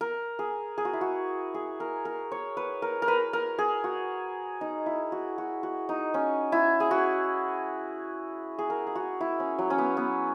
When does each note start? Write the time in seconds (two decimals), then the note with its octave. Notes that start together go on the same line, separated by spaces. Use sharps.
0.01 A#4
0.39 G#4
0.78 G#4
0.85 F#4
0.93 E4
1.01 F#4
1.54 G#4
1.80 A#4
2.05 A#4
2.32 C#5
2.57 B4
2.82 A#4
3.02 A#4
3.08 B4
3.33 A#4
3.59 G#4
3.84 F#4
4.61 D#4
4.86 E4
5.12 F#4
5.38 F#4
5.63 F#4
5.89 D#4
6.14 C#4
6.52 E4
6.80 G#4
6.91 F#4
8.59 G#4
8.70 A#4
8.87 G#4
8.95 F#4
9.21 E4
9.40 C#4
9.59 F#3
9.70 C#4
9.78 B3
9.97 B3